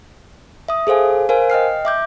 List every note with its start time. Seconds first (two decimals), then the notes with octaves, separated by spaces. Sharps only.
0.68 E5 D#6
0.87 G#4 A4 C5 F5 G#5
1.29 A#4 C5 F5 G#5
1.50 D#5 G5 F6 C7
1.85 E5 D6 G6